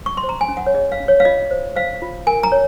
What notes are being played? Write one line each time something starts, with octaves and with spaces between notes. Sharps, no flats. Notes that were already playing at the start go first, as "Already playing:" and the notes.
C#6
C6
C5
A#5
G#5
C#4
F#5
C#5
G#4 D#5
F5
C#4
C#5
F5
F4 D#5
C5
C5 F5
F4
A#4 G#5
A#5
C#5